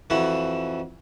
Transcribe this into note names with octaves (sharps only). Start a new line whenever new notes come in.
F2 E3 E4 F#4